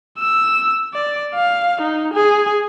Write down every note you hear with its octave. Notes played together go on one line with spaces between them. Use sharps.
E6
D5
F5
D#4
G#4